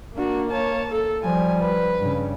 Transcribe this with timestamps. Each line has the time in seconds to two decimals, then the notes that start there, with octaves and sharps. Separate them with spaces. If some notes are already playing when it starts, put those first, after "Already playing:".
0.16 A#3 D4 F#4
0.51 C#5 A5
0.91 A4
1.23 F3 G3 G#5
1.60 B4
2.00 G2 C#3